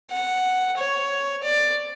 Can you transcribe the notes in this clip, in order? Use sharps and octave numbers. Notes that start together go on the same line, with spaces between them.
F#5
C#5
D5